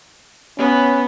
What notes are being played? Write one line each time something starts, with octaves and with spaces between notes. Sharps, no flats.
B3 C#4